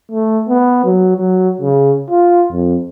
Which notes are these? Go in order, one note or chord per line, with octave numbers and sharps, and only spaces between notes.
A3
B3
F#3
F#3
C#3
F4
F2